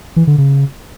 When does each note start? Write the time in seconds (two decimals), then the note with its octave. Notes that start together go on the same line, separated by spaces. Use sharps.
0.16 E3
0.27 D3
0.38 C#3